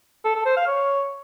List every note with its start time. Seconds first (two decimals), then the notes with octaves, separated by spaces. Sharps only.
0.25 A4
0.35 A4
0.46 C5
0.56 F5
0.67 C#5